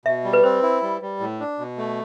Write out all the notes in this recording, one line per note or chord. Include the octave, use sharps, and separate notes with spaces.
B2 E5
G3
B4
C4 C5
E4
G3
G3
A2
D4
B2
A3